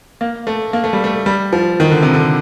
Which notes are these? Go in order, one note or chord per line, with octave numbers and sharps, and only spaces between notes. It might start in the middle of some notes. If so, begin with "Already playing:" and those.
A#3
A3
A#3
A3
G3
A3
G3
F3
D#3
D3
C3
D3